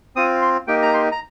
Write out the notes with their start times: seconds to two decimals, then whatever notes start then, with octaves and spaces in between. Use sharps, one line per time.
0.16 C4 F4 D#6
0.42 C6
0.67 A#3 D#4 G4 G5
0.83 A#5
0.94 C6
1.12 A#5